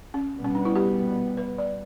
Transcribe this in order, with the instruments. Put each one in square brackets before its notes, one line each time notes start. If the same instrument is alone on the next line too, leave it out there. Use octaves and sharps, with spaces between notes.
[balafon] C#4
[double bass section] B2 G3 B3
[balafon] C#4
D4
E4
G4
B4
D5